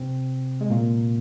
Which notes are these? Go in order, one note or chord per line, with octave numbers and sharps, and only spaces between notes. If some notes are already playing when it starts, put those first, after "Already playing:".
Already playing: C3 C4
G#3
A#2 A#3